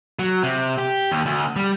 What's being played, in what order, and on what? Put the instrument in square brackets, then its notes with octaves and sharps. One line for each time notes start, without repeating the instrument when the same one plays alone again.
[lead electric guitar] F#3
C3
G4
D#2
D2
G3